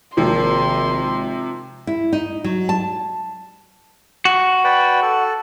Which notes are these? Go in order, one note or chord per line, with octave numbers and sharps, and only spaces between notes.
G#1 C3 F3 A#3 C4 C6
E4
D#4
F#3
A5
F#4
B4 D5 G5
A4